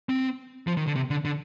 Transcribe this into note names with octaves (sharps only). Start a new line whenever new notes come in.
C4
F3
D#3
D3
C3
D3
D3